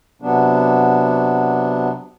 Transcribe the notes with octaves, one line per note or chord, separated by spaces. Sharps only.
C3 F#3 B3 D4